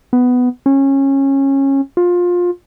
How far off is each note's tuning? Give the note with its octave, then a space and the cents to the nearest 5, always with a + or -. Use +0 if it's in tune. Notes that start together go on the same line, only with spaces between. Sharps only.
B3 +10
C#4 -20
F4 +20